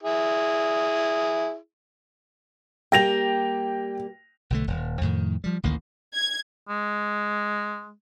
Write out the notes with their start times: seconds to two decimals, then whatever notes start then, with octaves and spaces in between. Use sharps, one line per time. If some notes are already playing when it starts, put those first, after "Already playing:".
0.03 E4 G#4
2.92 G3 A#3 G4 G5 A#6 F7
4.50 B1 D3 A3
4.67 D#1
5.01 F2 A2 D#3
5.44 F3 G3
5.63 A1 D2 D#3 A#3
6.13 G#6
6.69 G#3